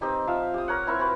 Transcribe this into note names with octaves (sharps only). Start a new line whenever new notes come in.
C4 D#4 G4 D#5
F3 E5 F5
G4 D#6
A#4 C#5 F#5
C4 E4 A#4 C#6
C4 F#4 B4